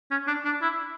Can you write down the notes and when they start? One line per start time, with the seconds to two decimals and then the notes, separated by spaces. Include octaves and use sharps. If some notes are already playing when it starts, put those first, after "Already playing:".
0.11 C#4
0.27 D4
0.45 D4
0.62 E4